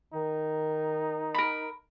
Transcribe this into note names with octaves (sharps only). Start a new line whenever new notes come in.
D#3 D#4
A#4 B5